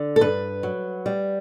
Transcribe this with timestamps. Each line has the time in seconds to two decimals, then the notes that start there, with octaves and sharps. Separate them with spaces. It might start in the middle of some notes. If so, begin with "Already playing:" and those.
Already playing: D3
0.16 A4
0.21 G2 B4
0.63 F#3
1.06 G3